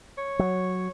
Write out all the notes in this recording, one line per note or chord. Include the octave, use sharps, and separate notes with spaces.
C#5
F#3